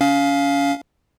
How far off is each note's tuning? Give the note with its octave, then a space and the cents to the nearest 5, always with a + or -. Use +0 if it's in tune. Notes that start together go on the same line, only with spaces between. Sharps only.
C#4 +30 F5 +0